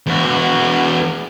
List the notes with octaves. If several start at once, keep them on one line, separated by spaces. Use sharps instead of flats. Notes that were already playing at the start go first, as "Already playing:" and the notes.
E2 F#4